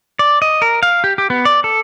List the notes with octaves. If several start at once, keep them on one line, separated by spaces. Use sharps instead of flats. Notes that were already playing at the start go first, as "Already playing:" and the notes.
D5
D#5
A#4
F5
G4
G4
B3
D5
A4